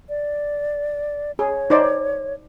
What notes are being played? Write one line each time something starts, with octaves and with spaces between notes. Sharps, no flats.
D5
G#4 C#5
D#4 C5 D5